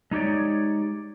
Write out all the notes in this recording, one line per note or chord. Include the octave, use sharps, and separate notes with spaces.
G#3 D#4 G4 C#5 D5